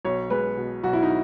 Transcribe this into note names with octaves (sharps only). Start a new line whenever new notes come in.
B1 C#5
G#3 B4
B2
B1 F#4
E4
D#4